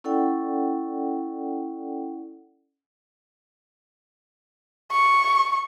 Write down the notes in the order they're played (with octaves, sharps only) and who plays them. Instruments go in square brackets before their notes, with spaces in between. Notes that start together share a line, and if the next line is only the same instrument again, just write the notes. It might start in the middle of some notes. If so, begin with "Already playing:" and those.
[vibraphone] C#4 E4 A4 D5 F#5 G5
[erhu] C#6